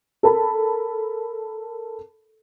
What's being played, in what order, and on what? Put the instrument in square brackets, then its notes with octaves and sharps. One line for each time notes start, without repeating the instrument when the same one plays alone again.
[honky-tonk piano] A4 A#4 A5 B5